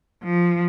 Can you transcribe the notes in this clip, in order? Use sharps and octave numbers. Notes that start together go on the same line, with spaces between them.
F3